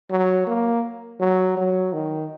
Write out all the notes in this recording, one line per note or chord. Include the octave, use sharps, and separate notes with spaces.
F#3
A#3
F#3
F#3
D#3